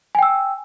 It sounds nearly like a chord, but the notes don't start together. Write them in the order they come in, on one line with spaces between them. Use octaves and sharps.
G#5 G5 E6